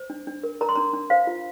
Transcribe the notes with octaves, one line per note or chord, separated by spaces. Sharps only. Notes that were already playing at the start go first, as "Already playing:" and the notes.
Already playing: C5
D4
D4
A#4
A#4 A#5
C6
D4 A#5
D4
C5 F5
F4